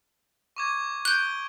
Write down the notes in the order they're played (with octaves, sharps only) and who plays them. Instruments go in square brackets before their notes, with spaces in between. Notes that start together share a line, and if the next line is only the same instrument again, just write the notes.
[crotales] C#6 D6 G#6
[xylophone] F#6 G6 [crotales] D7 G7